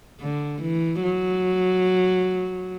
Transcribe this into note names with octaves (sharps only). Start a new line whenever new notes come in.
D3
E3
F#3